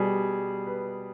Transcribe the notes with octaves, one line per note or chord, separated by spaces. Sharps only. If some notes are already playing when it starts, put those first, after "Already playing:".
Already playing: B2 G3 G#4
B4